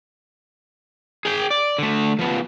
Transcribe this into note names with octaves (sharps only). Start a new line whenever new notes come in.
G#4 G5
D5
D3 A3
F3 B3